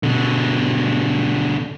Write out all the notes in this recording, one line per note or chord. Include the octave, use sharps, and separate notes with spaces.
B2 D3